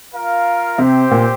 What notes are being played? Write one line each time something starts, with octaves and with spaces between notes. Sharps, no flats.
F4 A#4 F5
C3 C4 G4 C5
A#2